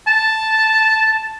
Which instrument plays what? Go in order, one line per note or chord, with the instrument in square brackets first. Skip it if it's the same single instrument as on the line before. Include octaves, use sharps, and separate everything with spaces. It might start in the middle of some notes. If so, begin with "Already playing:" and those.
[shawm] A5